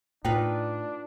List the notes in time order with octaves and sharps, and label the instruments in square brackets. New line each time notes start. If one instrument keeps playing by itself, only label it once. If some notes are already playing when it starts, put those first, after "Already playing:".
[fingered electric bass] A2 [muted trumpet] D4 [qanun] D#4 F4 B4 [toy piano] G5